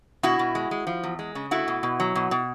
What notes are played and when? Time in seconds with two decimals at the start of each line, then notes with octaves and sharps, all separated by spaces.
0.23 B2 E4 F#4
0.39 B2
0.55 G#3
0.71 G#3
0.87 F3
1.04 E2
1.19 G#3
1.35 C#3
1.51 A3 E4 F#4
1.68 B2
1.83 B2
2.00 F#3
2.15 B2
2.31 B2